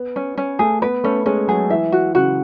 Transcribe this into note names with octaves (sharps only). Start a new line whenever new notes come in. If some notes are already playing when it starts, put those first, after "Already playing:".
Already playing: B3
C#4
C#4
A3 G#4
B3 B4
A3 C#4
G#3 C#4
F#3 G#4
E3 E5
F#4
C#3 F#4